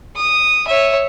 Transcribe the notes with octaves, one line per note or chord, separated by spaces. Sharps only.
D#6
C#5 E5